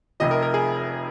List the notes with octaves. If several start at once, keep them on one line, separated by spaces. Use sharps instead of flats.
F1 F2 C3 F3 D#5
A#4
A#4
G#4